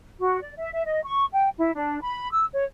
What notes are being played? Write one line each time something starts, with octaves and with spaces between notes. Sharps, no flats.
F#4
D5
E5
E5
D#5
C#6
G5
E4
D4
B5
E6
C#5